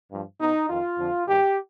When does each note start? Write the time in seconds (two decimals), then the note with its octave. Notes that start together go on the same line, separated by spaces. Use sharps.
0.11 G2 F3
0.39 B2 D#4
0.69 F2 D#3 F4
0.99 F2 D3 F3
1.27 G2 D#3 G4